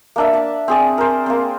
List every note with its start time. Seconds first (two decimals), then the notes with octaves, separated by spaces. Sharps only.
0.16 A#3 D4 E5
0.33 D5 A5
0.68 C4 G#4 D5
0.98 A#4 C5
1.26 A#3 C4